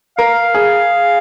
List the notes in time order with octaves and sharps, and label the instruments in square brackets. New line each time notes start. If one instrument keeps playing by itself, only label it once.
[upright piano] A#4 [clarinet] F5
[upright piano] G#4